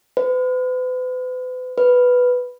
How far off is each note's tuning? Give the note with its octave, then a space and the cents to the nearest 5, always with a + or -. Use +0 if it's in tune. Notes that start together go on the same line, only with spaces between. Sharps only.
B4 +40
B4 +0